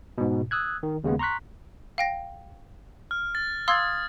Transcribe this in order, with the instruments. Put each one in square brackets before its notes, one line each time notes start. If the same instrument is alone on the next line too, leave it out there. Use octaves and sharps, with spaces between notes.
[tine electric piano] G#2 B2
D#6 E6 F#6 G#6
D#3
D#2 C#3 G#3 B3
A#5 C6 C#6 F#6 B6
[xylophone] F5 G5 A#6
[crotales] F6
A6
[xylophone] F5 C6 E6 [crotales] D#6 G#6 A6